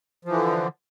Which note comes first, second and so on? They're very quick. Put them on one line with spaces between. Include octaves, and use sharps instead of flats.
F3 E3 D3